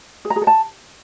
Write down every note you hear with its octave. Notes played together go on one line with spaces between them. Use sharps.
G#4
A#5
G#4
A4
A5